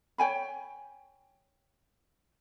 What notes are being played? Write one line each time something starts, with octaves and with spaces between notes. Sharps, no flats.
C#5 G5 G#5 B5